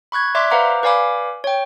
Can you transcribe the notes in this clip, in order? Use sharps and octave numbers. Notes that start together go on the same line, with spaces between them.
B5 C#6 F#6 G#6
D5 E5 C6 D6 F#6 B6
B4 C5 F5 F#5 A#5 D6
B4 D5 F5 G#5 B5 D6
C#5 G5